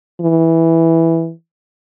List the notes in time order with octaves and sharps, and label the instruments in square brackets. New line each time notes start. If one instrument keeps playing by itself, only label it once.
[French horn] E3